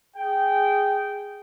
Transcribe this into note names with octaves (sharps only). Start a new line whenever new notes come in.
G#4 G5